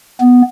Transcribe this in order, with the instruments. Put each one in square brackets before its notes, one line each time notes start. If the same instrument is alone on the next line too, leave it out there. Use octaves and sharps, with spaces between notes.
[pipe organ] B3